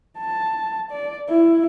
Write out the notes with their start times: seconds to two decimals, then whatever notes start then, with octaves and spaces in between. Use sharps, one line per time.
0.18 A5
0.91 D5
1.29 E4